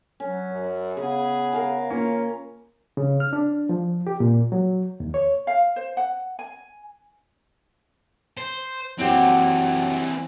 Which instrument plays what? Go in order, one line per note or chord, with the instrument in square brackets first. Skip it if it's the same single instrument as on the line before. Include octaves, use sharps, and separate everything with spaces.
[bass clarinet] F#3 [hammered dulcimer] C#4
[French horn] F#2
[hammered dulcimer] C#3 [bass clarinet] B3 [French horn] G#4
[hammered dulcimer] A#4 F5 G#5
[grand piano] A#3 C#4 [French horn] F4
[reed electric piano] C#3
F6
D4
F3
G4
A#2
F#3
D#2
C#5
[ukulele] F5
C5
F#5
G#5
[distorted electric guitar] C5
[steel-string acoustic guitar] F#2 F#4 G4 [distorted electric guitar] E3 C4